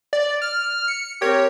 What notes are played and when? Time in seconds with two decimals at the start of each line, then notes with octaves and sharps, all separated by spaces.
0.13 D5
0.42 F6
0.88 C#7
1.22 C4 G4 A#4 C#5